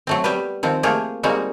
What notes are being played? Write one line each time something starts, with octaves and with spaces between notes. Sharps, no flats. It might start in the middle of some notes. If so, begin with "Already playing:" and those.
F#3 A3 C4
G3 B3 G4 B4
D#3 F3 C4
A3 A#3 F4 G4 G#4
G3 G#3 A#3 C4 D#4 F#4